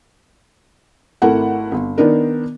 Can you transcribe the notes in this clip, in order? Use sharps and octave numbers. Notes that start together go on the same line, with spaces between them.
G#1 A3 E4 A#4 F#5
G1
D#3 B3 D4 D#4 A#4